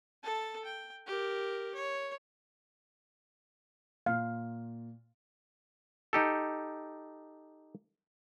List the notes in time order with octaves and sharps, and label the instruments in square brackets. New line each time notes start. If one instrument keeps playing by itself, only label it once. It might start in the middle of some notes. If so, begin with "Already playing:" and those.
[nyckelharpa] A4 A5
G5
G4 A#4
C#5
[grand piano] A#2 [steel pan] F5
[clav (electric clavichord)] D#4 G4 A4